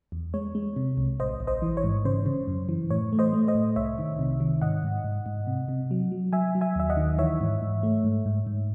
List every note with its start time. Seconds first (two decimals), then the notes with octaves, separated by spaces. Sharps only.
0.12 E2
0.34 G#3 C#5
0.55 G#3
0.76 C3
0.97 C2
1.20 A1 C5 D#5
1.40 A1
1.47 C5 D#5
1.62 E3
1.77 C#5
1.84 G#2
2.05 C#3 C5
2.26 C#3
2.48 F#2
2.69 E3
2.90 A2 C#5
3.13 A3
3.19 C5 D#5
3.33 A3
3.48 C5 D#5
3.55 A2
3.76 C2 C#5 E5
3.98 D#3
4.19 C3
4.40 D#3
4.61 G#2 D#5 F#5
4.83 G#2
5.04 G#2
5.26 G#2
5.47 C3
5.69 C3
5.91 F#3
6.12 F#3
6.33 F#3 E5 G#5
6.55 F#3
6.61 E5 G#5
6.76 D#2 E5
6.90 D#5 F#5
6.97 D#3
7.18 E3 C#5 E5
7.41 G#2
7.62 G#2
7.83 A3
8.04 G#2
8.26 G#2
8.47 G#2